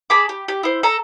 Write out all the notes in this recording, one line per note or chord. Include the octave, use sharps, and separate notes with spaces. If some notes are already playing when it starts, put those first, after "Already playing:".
G#4 A5 B5 D6
G4
G4
E4 C5
A4 A#5